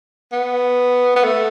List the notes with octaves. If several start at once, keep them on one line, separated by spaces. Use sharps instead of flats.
B3
B3
A3